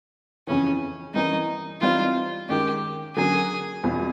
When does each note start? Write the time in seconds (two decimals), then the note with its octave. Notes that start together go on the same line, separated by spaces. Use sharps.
0.47 F2 C#3 E3 C#4
1.14 G2 E3 G3 A#3 C#4 D#4
1.81 E3 G3 C4 D#4 F4
2.49 D#3 G#3 C#4 G4
3.15 D3 F#3 A#3 C#4 G#4
3.83 E2 B2 G3 C4 F4